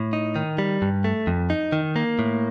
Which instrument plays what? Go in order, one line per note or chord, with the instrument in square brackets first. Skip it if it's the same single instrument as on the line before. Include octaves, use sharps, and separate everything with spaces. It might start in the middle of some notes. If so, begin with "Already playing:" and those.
Already playing: [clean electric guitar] A2
D#4
D#3
G3
G2
A3
F2
D#4
D#3
A#3
A2